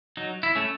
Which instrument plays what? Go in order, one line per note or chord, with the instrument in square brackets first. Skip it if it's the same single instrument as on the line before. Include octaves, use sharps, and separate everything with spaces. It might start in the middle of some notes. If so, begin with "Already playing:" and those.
[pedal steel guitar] F#3 D#4
E4
A3 C#4